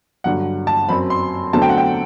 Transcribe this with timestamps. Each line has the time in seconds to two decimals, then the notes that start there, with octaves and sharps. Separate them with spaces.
0.24 G2 D3 F#3 F#5
0.67 A5
0.89 F#2 F#3 C4 B5
1.10 C6
1.53 E2 D3 F#3 A3 C4 A5
1.62 G5
1.69 F#5
1.78 G5